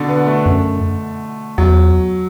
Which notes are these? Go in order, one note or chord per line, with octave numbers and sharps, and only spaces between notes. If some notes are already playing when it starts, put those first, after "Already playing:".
Already playing: B2 D3
B3
A3
F#2
E2 F#3